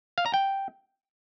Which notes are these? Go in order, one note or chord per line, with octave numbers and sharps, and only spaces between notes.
F5
A#5
G5